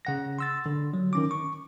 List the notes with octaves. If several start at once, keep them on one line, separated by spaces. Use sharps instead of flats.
C#3 F#5 A#6
C6 E6 A6
D3
F#3
D#3 C#4 D6
C#6